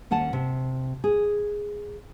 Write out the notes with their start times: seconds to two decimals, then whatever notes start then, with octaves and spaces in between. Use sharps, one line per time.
0.11 D#2 C#4 F#5 A5
0.33 C3
1.04 G#4